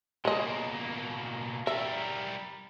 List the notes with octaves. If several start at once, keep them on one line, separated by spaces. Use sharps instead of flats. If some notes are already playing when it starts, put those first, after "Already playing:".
B2 G#3 A#3 D#5
G3 A#4 E5